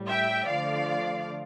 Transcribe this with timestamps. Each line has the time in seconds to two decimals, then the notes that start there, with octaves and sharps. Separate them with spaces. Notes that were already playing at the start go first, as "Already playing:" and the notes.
Already playing: A2 G3
0.09 E5 G5
0.48 D3 F3 A3 D5 F5